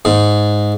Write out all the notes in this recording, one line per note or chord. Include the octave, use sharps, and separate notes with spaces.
G#2